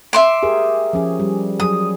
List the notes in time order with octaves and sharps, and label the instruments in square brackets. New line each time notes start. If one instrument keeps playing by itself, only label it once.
[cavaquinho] E5 C6 D6
[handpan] G4 G#4 A#4
F3 C#4 G#4
G3
[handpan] F#3 G#4 [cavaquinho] D#6